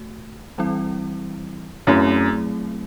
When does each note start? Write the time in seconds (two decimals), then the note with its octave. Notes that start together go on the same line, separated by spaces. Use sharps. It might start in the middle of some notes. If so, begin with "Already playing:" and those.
Already playing: A3 F#4
0.58 E3 G3 C4 E4
1.87 F#2 F#3 A3 C4 E4 G#4